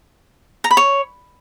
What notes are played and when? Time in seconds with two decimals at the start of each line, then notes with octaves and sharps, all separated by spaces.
0.64 A#5
0.71 B5
0.77 C#5